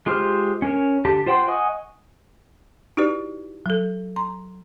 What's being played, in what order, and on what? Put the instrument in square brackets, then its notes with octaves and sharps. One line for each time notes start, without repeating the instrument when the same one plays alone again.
[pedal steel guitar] G#3 F4 G4 C5 F6
C#4 A#4 C#5
D3 G4 A5
F4 C5 F#5 G5 C6
D#5 F#5 G#5 C#6 D#6
[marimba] D#4 E4 F#4 G4 B4 D5
F#3 A4
A#5 C6